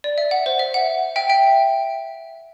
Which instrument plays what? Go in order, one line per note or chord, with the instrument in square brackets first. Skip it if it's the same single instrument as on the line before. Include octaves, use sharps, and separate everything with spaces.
[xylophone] D5
E5
F#5
C5
E5
F#5
E5 G5
E5 G5